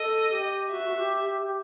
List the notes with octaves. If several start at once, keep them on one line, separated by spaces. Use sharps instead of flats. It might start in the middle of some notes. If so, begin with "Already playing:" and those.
Already playing: A4 D#5
G4
F#4 E5
F#4
G4
G4
G4